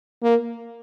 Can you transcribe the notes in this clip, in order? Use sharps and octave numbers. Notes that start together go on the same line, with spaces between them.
A#3